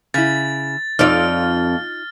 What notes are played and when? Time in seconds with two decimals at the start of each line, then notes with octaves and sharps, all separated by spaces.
0.14 C#3 E4 A6
0.99 F2 D#4 F4 D5 F6